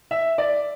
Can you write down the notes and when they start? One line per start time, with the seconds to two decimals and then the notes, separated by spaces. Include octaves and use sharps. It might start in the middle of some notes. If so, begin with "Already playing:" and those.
0.11 E5
0.38 D5